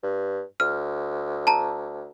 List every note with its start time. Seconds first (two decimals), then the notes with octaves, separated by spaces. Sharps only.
0.03 G2
0.60 D2 F6
1.47 A5 A#5